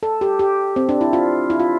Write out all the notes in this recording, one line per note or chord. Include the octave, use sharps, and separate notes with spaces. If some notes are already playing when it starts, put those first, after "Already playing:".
A4
G4
G4
C4
D4
E4
F4
E4
F4